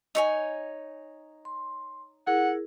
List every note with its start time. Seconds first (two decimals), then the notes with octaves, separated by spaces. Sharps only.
0.15 D#4 C#5 G#5
1.45 C6
2.27 E4 G#4 A#4 F#5